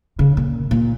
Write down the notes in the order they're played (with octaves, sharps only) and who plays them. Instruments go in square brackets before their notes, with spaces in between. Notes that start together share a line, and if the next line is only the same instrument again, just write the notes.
[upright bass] C#3
A#2
A#2